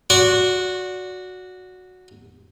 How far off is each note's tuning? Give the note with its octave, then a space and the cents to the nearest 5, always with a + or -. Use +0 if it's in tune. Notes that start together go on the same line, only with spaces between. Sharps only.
F#4 -10 D5 -25 C#6 -40